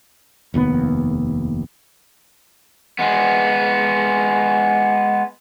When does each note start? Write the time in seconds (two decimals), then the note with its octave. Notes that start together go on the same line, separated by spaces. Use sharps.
0.54 F1 D#2 A2 B3
2.99 G#3 B3